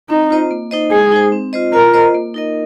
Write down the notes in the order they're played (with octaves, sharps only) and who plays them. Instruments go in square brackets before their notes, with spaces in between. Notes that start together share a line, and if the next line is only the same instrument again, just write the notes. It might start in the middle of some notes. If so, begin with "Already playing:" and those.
[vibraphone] C4 [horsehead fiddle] D#4
[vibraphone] F4 C5 D#5
A#3
D#4 C5 D#5
[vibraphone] G#3 [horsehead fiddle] G#4
[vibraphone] D#4 C5
C4
F4 C5 D#5
[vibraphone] F4 [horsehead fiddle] A#4
[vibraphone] C5 D#5
A#3
D#4 A#4 D#5